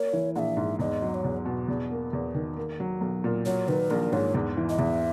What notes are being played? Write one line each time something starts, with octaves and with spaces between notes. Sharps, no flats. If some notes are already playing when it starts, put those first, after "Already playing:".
Already playing: A#3 C#5
E3
A#1 E5 F#5
G#2
E2 D#5
F#3
D#5
C#5
E2
B2
E2
A#3
E2
D#3
A#3
F#3
B1
A#2
F#3 C#5
D#3 B4
A#1 A#4
G#2 C#5
E2
E3
D#5
E2 E5